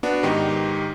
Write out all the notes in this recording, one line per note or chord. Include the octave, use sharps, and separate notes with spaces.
B3 D4 F#4
G#2 D#3 D#4 G4